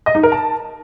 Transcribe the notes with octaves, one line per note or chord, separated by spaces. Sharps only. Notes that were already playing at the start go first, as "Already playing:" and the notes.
D#5
D#4
A#4
A5